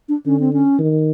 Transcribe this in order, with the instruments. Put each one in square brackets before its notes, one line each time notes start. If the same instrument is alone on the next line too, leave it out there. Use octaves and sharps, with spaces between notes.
[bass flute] D4
[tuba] D3 [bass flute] C#4
[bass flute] C4
C#4
[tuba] D#3